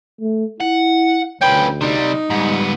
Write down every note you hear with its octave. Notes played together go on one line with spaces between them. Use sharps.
A3
E4 F#5
D2 C#4 B4 G5
C3 G3 D#4
G#2 G3 B3